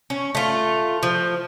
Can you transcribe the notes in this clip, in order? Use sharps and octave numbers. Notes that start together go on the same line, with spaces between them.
C#4
A3 F4
F3